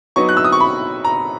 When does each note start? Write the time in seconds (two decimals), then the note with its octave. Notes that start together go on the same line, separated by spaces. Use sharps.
0.16 F#3 B3 D#4 C#6
0.29 F#6
0.37 E6
0.44 D#6
0.52 C#6
0.60 B5
1.04 A#5